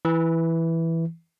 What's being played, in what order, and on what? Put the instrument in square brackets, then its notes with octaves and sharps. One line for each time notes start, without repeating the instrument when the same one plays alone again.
[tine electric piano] E3